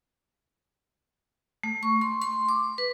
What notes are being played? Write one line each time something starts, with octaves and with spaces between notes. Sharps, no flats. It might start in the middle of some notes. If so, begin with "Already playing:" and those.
A3
C#6
C6
C6
D6
B4